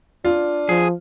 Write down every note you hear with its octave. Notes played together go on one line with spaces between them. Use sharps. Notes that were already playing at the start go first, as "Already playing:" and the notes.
D4 F4
F3 G#4